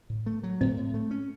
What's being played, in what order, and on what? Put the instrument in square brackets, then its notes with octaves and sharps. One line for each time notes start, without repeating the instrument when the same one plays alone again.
[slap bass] A2
A3
F#3
[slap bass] A2 [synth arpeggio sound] C4
[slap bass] A2
A3
C#4